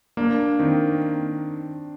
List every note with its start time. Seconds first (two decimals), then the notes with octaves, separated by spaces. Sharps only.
0.17 A#3 D4
0.59 D#3 C4